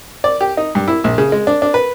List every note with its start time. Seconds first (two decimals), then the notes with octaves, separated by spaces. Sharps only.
0.24 D5
0.41 G4
0.57 D#4
0.75 G2
0.88 E4
1.04 A#1
1.18 C#3
1.32 G#3
1.47 D4
1.62 D4
1.74 B4